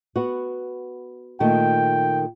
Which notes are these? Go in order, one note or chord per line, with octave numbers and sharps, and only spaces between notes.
B3 F#4
A#2 D#3 A3 G5